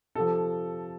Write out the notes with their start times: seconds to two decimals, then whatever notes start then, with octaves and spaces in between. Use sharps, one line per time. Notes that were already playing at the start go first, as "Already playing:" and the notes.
0.15 C3 F3 A4